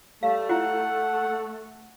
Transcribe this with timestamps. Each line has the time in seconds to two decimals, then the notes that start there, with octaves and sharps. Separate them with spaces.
0.23 G3 A3 F5
0.49 E4 F#4 F#5